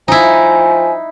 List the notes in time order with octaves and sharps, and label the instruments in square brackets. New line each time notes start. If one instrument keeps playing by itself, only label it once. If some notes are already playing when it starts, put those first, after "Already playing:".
[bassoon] F3 [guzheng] D#4 E4 [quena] G#5